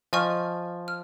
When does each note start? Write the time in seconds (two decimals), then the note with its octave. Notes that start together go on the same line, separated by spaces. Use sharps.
0.13 F3 D#5 G#5 C#6 F6
0.88 F6